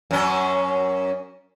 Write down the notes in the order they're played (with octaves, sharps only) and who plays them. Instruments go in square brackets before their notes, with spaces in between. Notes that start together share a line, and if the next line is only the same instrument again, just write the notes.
[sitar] F#2 C#4